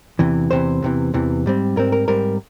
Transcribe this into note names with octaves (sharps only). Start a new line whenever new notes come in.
E2 C3 E3
E2 C3 E3 C5
E2 C3 E3
E2 C3 E3
G#2 G3 C4
G#2 G3 C4 A#4
A#4
G#2 G3 C4 A#4